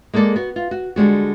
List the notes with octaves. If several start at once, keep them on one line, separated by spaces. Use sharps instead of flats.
G#3 A#3 G#4 A4 D5
B3 F#4
F4
F#4
D3 G3 G#3 F#4